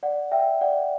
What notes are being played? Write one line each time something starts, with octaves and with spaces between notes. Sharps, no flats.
D5 F#5
E5 G5
D5 F#5